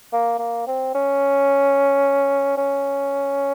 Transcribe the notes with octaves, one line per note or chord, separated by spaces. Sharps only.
A#3
A#3
C4
C#4
C#4